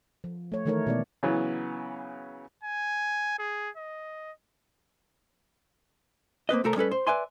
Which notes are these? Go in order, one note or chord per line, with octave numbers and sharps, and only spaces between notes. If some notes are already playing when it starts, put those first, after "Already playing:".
F3
A3 C#5
D#3 E3 A3 D#4 A#4 C#5
B2 G#3 B3 D#4 D5
C#3 E3 F#3 B3
G#5
G#4
D#5
A#3 C4 B4 D#5
C2 A3 A4 A#4 A#5
G3 C#4 A4 B4
C5
B4 D5 E5 G#5 C6